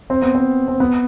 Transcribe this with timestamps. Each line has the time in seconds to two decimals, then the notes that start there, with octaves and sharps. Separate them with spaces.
0.10 C4
0.22 B3
0.35 C4
0.68 C4
0.80 B3